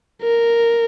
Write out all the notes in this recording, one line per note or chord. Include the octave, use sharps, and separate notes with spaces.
A#4